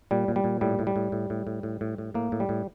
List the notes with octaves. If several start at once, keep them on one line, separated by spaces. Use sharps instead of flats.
A#2 G3
A#2
G3
A#2
A2 G3
A2
G3
A2
A2
A2
A2
A2
A2
A2
A2 A#3
A2
G3
A2